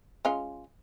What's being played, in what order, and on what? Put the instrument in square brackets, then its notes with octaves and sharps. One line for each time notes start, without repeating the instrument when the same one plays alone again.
[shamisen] G#3 C#4 F4